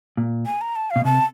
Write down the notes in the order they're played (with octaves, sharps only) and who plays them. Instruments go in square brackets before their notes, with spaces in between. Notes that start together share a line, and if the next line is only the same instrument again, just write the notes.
[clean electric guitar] A#2
[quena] G#5
A#5
A5
F5
[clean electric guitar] B2
[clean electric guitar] C3 [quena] A5